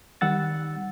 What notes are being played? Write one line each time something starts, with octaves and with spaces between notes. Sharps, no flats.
D#3 G3 F#5 E6 A6